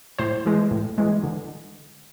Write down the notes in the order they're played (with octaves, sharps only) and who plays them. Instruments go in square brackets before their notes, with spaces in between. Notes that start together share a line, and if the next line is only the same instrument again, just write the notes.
[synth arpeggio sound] A2 C5
E3 G#3
A2
E3 G#3
D3